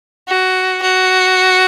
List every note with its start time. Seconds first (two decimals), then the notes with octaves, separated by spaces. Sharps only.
0.28 F#4
0.82 F#4